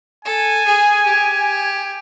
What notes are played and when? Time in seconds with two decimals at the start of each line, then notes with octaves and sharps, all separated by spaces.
0.25 A4 G#5
0.66 G#4
1.06 G4